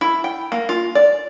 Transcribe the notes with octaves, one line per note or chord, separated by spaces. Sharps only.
E4
G5
A#3
F4
D5